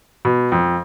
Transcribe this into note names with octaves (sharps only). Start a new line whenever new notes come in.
B2
F2